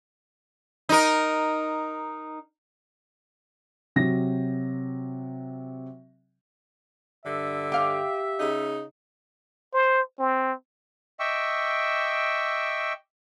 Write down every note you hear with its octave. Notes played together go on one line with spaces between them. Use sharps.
D#4 A#4
C3 F#3 A#6
G2 D3 E5
G4 F5 G5
C#3 D#4
C5
C4
D#5 E5 G5 C#6 D6 E6